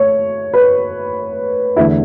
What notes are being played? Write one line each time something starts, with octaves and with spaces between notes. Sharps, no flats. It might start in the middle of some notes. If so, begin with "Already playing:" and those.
Already playing: A3 C#5
B4
E2 D3 A3 E4